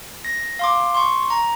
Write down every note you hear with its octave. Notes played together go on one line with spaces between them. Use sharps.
A#6
F5 C6 D6
C6 C#6
A#5